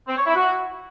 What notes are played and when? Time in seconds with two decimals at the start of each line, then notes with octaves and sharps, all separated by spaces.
0.08 C4
0.17 C#5
0.27 E4
0.36 F#4